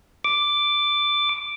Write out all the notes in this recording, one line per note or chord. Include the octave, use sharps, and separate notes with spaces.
D6